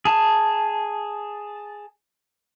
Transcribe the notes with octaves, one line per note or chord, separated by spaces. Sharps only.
G#4 A5